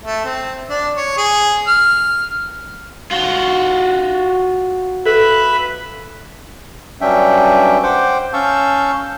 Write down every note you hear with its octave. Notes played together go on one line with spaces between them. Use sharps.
A3
C4
D4
C#5
G#4
F6
F4 F#4
A4 B4 E5 B5
G2 F#3 C#4 D4 E5 G5
C5 F#5 G5 D6
C#4 F5 A5 C#6 E6 G6